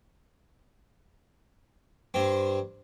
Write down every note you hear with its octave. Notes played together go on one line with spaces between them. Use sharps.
G2 C4